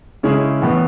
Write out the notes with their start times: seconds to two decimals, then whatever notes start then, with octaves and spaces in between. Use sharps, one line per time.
0.23 C#3 G#3 C#4 E4 G#4
0.62 A2 E3 B3